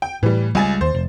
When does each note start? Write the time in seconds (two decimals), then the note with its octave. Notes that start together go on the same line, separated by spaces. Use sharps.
0.02 G5
0.23 A2 E3 G3
0.55 C#2 G3 G#3 G#5 A6
0.81 D#2 C5
0.95 F1